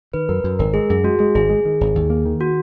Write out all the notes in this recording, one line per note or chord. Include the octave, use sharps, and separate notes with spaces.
D#3 B4
F#2 A#4
F#2
G#1 A#4
G#3 G#4
F#2 G#4
G#3 F#4
G#3 G#4
G#1 G#4
G#3
D#3
G#1
D#2
A#3
D#3
F#4